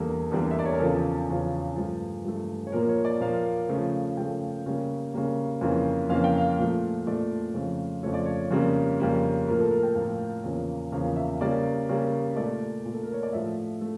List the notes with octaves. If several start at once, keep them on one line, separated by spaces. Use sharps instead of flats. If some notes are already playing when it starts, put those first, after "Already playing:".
Already playing: E2 D3 G3 A#3 A4
E2 D3 G3 A#3
E5
D5
C#5
A#4
E2 C#3 F3 A4
E2 C#3 F3
G2 F3 A3
G2 F3 A3
C#5
A#2 F3 A#3 A#4
C#5
D5
A#2 F3 A#3 F5
C#3 F3 A3
C#3 F3 A3 G5
C#3 G3 A#3
C#3 G3 A#3
F2 C#3 E3 A#3
F2 C#3 E3 A#3 F5
G5
F5
A#2 F3 A3
A#2 F3 A3 D5
F2 C#3 F3 A3
F2 C#3 F3 A3 C#5
D5
C#5
F2 C#3 G3 A#3
F2 C#3 G3 A#3
A2 F3 A#3 A#4
A4
A#4
G5
A2 F3 A#3 F5
E2 C#3 F3 A#3
E2 C#3 F3 A#3 F5
E5
C#3 G3 A#3 D5
C#3 G3 A#3
A#2 A3 D5
A#2 A3
A4
A#4
C#5
D5
A2 F3 A3 E5
A3